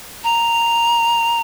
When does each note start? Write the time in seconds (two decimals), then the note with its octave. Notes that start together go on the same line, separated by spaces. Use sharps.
0.24 A#5